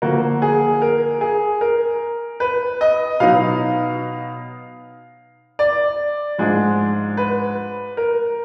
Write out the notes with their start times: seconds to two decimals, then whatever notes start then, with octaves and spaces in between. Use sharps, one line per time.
0.02 D3 F3 A#3 F#4
0.42 G#4
0.82 A#4
1.21 G#4
1.61 A#4
2.40 B4
2.81 D#5
3.20 B2 F#3 B3 D#4 F5
5.59 D5
6.38 G#2 F3 G#3 D4
7.17 B4
7.97 A#4